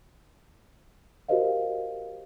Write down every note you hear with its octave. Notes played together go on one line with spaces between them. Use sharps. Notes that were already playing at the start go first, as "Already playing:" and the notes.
F#4 G4 A#4 C5 D#5 F5